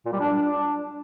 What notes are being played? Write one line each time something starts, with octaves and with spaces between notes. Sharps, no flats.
A#2
G3
D4